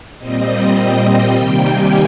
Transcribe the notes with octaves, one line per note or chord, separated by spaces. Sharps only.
A#2 G3 C4 D#5
G5
C3 D#3 G3 A#3
G#5